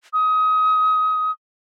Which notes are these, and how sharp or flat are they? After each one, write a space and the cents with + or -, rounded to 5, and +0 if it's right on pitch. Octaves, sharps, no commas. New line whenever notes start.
D#6 +25